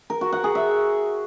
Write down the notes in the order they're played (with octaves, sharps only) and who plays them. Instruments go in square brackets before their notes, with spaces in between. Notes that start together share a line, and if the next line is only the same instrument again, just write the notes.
[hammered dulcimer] A#4
F#4
F#5
G#4
E5